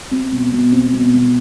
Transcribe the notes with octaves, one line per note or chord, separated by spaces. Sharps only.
C4
B2
B2
C4
B2
B2